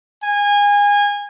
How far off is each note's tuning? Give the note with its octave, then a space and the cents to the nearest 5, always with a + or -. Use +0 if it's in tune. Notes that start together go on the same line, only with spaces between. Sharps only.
G#5 -25